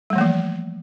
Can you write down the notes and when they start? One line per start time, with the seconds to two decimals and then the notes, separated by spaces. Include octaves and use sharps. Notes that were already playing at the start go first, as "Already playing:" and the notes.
0.10 G3
0.13 A3
0.16 E3
0.18 A#3
0.21 F3